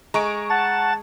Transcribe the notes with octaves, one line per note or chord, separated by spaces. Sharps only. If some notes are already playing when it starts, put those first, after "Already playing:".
G#3 A#5 C#6 D7
F#5 A5 A6